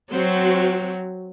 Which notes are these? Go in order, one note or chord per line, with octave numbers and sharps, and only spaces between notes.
F#3 C4 F#4